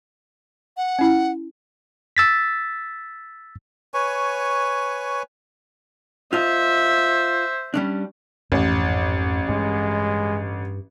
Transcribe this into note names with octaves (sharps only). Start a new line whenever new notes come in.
F#5
C#4 E4
E6 A6 B6
B4 C#5 G#5 C#6
F4 C5 D#5 E5
G3 C#4 D4
A1 F2 G#2
G2 G#3